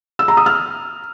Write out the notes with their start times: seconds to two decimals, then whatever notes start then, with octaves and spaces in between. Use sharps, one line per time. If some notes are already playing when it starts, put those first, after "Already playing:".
0.19 E6
0.28 A#5
0.37 D#6
0.46 F6